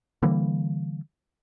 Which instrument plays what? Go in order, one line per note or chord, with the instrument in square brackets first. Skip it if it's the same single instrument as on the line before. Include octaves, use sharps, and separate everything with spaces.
[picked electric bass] D3 E3 G3 A#3